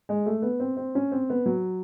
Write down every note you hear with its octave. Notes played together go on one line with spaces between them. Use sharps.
G#3
A3
B3
C4
C4
C#4
C4
B3
F#3